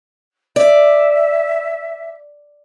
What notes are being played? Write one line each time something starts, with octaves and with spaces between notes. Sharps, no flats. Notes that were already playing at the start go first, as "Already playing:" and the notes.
D5 E5